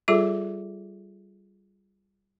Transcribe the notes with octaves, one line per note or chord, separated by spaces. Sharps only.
G3 F4 G#4 A4 E5 D6